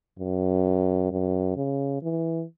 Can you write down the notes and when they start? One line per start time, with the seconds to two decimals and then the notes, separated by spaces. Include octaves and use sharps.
0.18 F#2
1.11 F#2
1.56 C#3
2.02 E3